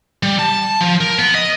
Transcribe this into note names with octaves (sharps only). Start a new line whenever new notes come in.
G3
A5
F3
A#4
B3
D#5